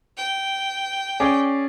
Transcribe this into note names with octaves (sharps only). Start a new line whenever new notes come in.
G5
C#4 G#4 D5